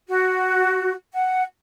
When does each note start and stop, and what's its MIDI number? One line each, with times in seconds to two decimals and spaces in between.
0.09 0.93 66
1.13 1.44 78